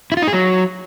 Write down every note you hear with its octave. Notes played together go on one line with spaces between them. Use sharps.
E4
F4
D#4
G#4
F#3